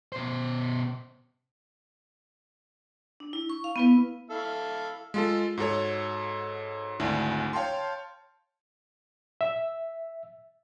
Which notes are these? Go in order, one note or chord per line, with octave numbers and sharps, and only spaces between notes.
B2 C5
D4
E4
C#6
F5
B3 E4 B4
E4 A4 F5
G#3 F4 A4
G#2 F#4 A4 C#5
G#1 D2 D4 E4
C#5 F5 G5 A5 C6
E5